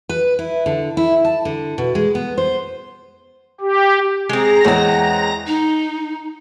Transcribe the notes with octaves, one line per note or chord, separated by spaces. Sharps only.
B4
E4
D3
E4
A5
D3
B2
G#3
B3
C5
G4
G#3 C4 G#4 A#5 A#6
E2 G#3 C4 C#5 D#5 F#5
D#4